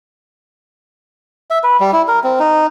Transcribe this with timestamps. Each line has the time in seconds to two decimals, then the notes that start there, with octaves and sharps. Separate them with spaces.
1.50 E5
1.63 B4
1.80 G3
1.93 E4
2.08 A#4
2.24 C4
2.39 D#4